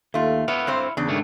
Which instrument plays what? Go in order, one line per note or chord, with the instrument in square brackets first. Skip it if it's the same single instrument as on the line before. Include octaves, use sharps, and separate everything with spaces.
[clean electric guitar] D#2 [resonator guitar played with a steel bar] A3 F4
[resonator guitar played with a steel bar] B3 [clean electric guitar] E4 C#5 F5
[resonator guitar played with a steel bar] G2 C4 C5
[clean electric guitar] E2 [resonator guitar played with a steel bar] C#3 D4
[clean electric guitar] G#2 D#3 A3